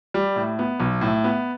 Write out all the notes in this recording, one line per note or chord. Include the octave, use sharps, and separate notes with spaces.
G3
A2
B3
B1
A2
B3